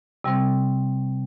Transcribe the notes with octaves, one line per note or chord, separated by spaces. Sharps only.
C3 G3 C4